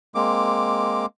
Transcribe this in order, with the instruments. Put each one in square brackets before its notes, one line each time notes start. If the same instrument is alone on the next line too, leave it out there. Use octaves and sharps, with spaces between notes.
[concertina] G#3 A#3 C4 D6